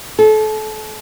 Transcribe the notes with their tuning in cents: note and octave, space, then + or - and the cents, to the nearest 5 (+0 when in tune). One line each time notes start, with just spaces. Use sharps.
A4 -30